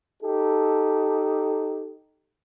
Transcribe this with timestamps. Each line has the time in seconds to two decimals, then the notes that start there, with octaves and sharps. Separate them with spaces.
0.23 D#4 G4 A4